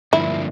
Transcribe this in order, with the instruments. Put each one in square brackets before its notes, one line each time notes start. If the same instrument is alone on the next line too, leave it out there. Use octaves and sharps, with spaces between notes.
[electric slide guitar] G2 D3 F3 A#3 D4 [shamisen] E4